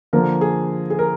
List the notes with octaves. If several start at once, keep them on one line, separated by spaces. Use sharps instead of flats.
D3 F3 A#3 A#4
G#4
G#4
A#4